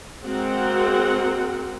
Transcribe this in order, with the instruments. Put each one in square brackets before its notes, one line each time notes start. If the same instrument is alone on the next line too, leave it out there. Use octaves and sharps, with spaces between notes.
[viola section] G#3 A#3 C4 F#4 A#4 F#5